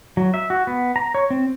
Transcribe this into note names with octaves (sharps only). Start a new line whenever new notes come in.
F#3
E5
F#4
B3
A#5
C#5
C4